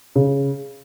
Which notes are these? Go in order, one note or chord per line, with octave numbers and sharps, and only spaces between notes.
C#3